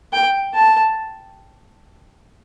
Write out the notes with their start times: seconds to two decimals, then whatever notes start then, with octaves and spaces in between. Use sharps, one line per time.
0.13 G5
0.55 A5